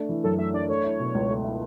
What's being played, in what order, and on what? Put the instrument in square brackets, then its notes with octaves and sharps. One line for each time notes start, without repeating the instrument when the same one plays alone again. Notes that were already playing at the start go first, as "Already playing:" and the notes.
Already playing: [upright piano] A3 D4
E3
[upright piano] F#2 [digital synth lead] A4
[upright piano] A3 [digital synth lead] E5
[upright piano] D4 [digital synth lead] D5
[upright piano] A3 [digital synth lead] C#5
[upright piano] E4
B2
C#2
A3
E4